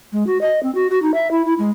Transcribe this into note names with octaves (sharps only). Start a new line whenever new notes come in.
G#3
F#4
D#5
C4
F#4
F#4
D#4
E5
E4
E4
G#3